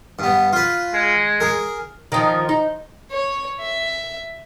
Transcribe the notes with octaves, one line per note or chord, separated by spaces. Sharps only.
G2 B3
F4 B4
G#3
G#4 A#4
D#3 F3
D#4
C#5
E5